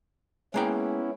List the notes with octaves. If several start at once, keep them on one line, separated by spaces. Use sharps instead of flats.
G#3 A#3 B3 C#4 E4 G5